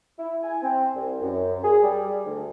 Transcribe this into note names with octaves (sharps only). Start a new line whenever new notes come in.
E4
G#5
C4
C2
F#2
G#4
G3
D2